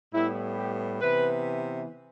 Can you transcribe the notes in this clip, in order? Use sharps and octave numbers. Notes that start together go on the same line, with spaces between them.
A2 G3 B3 E4
G4
C3 E3 B3 B4